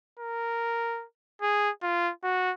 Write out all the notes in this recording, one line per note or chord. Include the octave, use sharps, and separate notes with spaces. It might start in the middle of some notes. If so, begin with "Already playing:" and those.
A#4
G#4
F4
F#4